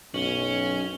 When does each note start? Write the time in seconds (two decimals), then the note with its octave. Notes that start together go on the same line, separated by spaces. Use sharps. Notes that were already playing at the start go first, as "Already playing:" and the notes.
0.14 B1 F#2 C#4 F#7 G7